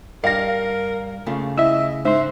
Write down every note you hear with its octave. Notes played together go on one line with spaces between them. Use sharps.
G2 A#4 F5 A#6
C#3 A3 F4
E4 D#5 E5 E6
G#2 C5 E5 C6